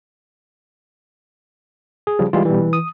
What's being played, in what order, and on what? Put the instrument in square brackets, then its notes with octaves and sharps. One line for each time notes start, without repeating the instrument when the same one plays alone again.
[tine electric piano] G#4
[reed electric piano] C#3 F3 G3
[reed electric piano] E3 G3 G#3 [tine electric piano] F4
[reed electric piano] B2 G3 [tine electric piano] E3
[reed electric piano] D#6